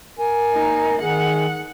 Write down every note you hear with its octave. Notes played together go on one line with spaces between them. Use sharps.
A#4 G#5
A#3 D#4
D#3 G#4 F#5